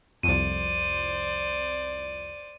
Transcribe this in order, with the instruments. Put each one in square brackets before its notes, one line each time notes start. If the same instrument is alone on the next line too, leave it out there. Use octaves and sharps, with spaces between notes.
[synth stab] C2 F2 [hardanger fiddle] C5 D5 [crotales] D#7